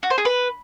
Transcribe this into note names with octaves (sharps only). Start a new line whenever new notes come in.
F#4
C5
G#4
B4